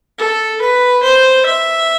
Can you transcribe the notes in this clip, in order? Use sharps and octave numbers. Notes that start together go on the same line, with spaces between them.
A4
B4
C5
E5